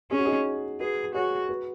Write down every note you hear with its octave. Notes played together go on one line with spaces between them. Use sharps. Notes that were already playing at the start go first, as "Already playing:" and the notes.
C#4 G#4
F#4
D#4 G#4
F#4 G#4 B4
F#4 G#4 C#5
F#4 B4